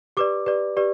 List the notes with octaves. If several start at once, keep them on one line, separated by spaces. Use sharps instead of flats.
G4 B4 D5 D6
G4 B4 D5
G4 B4 D5